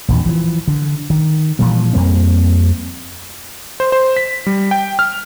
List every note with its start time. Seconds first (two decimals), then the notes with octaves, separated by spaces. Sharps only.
0.08 A#1 E2 D#3
0.26 E3 F3
0.68 D3
1.10 D#3
1.59 A#2 E3 F3 G3
1.93 F2 G3 A#3 C4
3.80 C5
3.92 C5
4.17 B6
4.46 G3
4.71 G5
4.99 F6